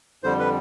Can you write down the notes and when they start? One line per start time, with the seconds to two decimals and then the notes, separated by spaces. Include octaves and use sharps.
0.23 F2 D3 G3 C5
0.39 B4